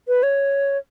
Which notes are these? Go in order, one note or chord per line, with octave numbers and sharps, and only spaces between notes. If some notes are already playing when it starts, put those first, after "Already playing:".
B4
C#5